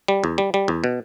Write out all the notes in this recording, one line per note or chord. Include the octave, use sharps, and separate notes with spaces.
G3
E2
G3
G3
E2
B2